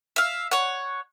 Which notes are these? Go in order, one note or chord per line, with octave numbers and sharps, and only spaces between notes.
E5 F5
C#5 F#5